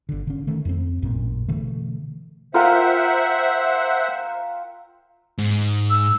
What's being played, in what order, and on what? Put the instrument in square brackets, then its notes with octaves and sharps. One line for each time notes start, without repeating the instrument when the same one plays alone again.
[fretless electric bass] G1 D3
D3 C#4
D#3 A3
F2 B3 C4
A1 F#2 A#2
B2 D3 E3 A3
[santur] F4 A#4 G5 [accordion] C5 E5 F#5
[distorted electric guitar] G#2
[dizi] E6